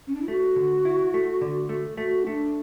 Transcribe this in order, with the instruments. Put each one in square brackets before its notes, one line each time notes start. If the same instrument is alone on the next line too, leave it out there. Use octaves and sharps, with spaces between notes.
[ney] C#4
D4
E4
[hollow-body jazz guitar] A3 [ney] F#4
[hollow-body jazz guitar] D3
E4
A3
D3
A3
[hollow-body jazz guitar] A3 [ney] F#4
[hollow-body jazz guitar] A3 [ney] D4